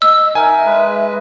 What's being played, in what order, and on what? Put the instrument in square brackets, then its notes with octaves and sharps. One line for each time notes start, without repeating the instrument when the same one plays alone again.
[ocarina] D#5 [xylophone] E6
[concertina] D#4 A#4 [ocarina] E5 [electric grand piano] G#5
[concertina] G#3 B4